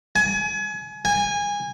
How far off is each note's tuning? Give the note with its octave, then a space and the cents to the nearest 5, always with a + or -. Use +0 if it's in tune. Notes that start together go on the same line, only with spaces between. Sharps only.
G#5 +30
G#5 -20